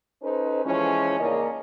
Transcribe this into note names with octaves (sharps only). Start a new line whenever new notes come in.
C#4 D#4 A4 B4 C5
E3 F3 G#3 C#4
E2 C#3 A#3 D#4 D5 D#5